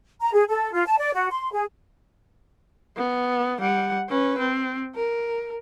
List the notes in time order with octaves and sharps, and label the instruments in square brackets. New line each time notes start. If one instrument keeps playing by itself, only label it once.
[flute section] A#5
G#4
A4
F4
A5
D5
F#4
C6
G#4
[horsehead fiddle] B3
G3 F#5
C#4 B4
C4
A#4